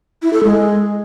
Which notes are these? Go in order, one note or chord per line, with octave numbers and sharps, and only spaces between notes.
E4
A4
G#3